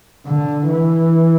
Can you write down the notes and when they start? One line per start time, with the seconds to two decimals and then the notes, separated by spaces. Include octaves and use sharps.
0.27 D3
0.68 E3